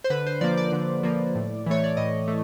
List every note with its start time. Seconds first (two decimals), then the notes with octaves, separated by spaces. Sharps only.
0.04 C5
0.10 D3 B4
0.26 C5
0.41 F3 A#3 D5
0.57 D5
0.72 D3
1.03 F3 A#3
1.35 A2
1.66 E3 A3 C#5
1.84 D5
1.97 A2 D#5
2.28 A3